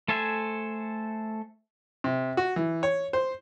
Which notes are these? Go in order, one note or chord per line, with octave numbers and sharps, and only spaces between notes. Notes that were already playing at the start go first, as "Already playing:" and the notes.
A3 A4 C5 E5 G#5
C3
F#4
E3
C#5
C5